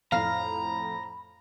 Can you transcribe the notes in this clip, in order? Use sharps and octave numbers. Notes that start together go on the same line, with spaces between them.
F2 A2 F5 A#5 B5